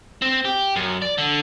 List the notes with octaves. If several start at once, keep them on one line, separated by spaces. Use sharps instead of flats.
C4
G4
F#2
D5
D3